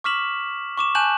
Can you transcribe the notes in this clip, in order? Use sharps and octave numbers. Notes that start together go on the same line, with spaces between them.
C#6 D6 F6 B6 E7 F#7
C#6 D6 E7
G#5 A5 F#6 G6 E7 F#7